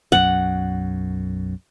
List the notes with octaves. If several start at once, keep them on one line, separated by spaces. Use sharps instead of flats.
B1 F#2 F#5